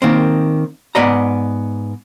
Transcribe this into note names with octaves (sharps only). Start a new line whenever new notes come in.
D#3 A#3 C4
G#2 B3 D5 D#5 A#5